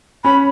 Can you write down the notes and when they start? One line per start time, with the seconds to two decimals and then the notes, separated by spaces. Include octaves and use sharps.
0.24 C#4 B5